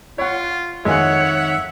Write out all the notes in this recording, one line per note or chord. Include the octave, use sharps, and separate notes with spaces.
F4 C#5 F#5
F2 D#3 G#3 C#5 E5 F#5 G#5